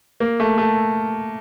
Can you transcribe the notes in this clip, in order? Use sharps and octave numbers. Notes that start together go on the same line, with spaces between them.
A#3
A3
A3